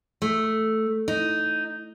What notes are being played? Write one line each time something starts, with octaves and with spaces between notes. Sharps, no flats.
A3
D#4